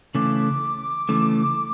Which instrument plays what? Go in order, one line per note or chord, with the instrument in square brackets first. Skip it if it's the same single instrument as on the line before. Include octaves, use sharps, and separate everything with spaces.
[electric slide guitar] C#3 E3 A3 [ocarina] D6
[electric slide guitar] C#3 E3 A3